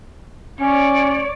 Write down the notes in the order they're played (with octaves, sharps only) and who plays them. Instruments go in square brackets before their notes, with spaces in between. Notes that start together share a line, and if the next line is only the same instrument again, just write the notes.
[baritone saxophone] C#4 [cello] C#5 D5